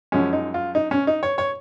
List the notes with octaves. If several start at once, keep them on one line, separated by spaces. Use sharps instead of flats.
F#2 F3 G#3 C#4
D#4
F4
D#4
C#4
D#4
C#5
C#5